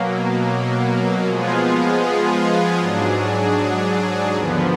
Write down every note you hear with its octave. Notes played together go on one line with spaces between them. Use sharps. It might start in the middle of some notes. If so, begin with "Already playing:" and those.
Already playing: B2 F#3 A#3
F3 G#3 B3 F4 G#4
G#2 F#3 D4 G#4
D#2 D3 F3 B3